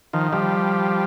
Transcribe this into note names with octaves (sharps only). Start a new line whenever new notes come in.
D#3 F3
F3 G3